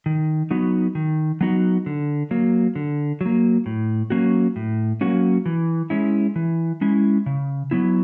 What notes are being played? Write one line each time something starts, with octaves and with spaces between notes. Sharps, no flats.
D#3
F#3 B3 D#4 F#4
D#3
F#3 B3 D#4 F#4
D3
F#3 A#3
D3
F#3 A#3
A2
F#3 A#3 C#4 F#4
A2
F#3 A#3 C#4 F#4
E3
G#3 C#4 E4
E3
G#3 C#4 E4
C#3
F#3 B3 E4